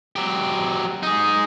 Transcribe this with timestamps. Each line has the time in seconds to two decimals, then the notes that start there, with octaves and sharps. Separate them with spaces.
0.16 F#3 G4
1.03 D#4 G#4